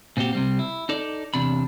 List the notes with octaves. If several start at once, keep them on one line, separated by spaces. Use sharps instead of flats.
A#2 C4 F#4 G4
C3 G3 C4
E4
D#4 A4 D5
E2 C3 D4 B5